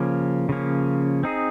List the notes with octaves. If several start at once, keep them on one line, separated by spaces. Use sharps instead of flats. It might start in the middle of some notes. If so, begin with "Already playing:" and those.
Already playing: C#3 F3 A#3 C#4
C#3 F3 A#3 C#4
C4 D#4 G#4